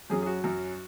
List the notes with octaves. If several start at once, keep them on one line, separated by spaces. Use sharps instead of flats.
F#2 F#3 C#4 G#4
G#4
F#4
F#2 F#3 C#4